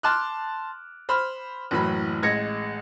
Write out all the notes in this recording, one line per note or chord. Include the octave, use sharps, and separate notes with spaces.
A5 C6 D6 F6 F#6
C5 B5 F6
F#1 A2 E3 F#3 B5
A1 G#3 G#6 A#6 C#7